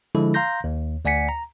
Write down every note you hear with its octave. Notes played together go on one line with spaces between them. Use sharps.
D3 F3 G#3 E4 A4
F5 A#5 C6 G6 A#6
D#2
D2 D5 F#5 G#5 B6 C#7
A#5